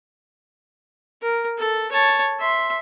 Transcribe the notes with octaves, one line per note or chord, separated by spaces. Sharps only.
A#4
A4
C#5 A5
E5 C6